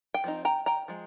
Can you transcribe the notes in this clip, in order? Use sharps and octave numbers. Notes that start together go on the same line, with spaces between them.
G5
F3 C4 D#4
G5 A#5
G5 A#5
F3 G#3